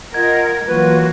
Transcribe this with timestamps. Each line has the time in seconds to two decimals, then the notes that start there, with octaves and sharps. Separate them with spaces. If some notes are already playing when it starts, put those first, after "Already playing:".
0.14 F4 A#4 D#5 F#5 G#6
0.67 E3 F#3 A#3 F4 F#4 B4